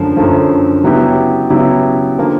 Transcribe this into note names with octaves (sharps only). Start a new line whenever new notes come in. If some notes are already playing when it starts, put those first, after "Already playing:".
Already playing: F#2 D3 F3 A3
F#2 D3 F3 A3
C#3 F#3 B3 E4 G4
C#3 F#3 B3 E4 G4
D3 F3 A#3